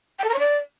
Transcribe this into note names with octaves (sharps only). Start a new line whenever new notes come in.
G5
A4
A#4
C#5
D5